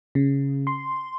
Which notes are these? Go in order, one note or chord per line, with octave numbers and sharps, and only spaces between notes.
C#3
C6